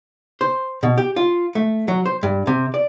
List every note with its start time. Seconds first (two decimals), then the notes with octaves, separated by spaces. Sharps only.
0.41 C5
0.83 B2
0.98 G4
1.16 F4
1.55 A3
1.88 F#3
2.06 C5
2.23 G2
2.47 C3
2.74 D5